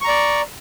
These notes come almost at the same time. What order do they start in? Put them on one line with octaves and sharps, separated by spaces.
C#6 A#5 D5